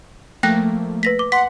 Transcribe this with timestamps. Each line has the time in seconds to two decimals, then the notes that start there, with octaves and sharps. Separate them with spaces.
0.43 F3 A3 A#3 G5 F#6 A#6
1.03 B4 A#6 B6
1.19 D6
1.32 F#5 C6 B6